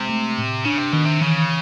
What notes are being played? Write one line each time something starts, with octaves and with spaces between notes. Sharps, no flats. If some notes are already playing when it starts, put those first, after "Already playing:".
Already playing: C3 G#3
A3
A2
C#3 D4
C3
B2 D#3
C3
C#3 E3